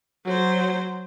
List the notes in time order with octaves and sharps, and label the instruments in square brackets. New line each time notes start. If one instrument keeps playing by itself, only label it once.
[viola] F#3 C5